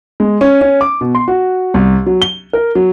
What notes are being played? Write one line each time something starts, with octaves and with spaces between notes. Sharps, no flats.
G#3
C#4
C#4
D6
B2
C6
F#4
C2
F#3
G7
A#4
F#3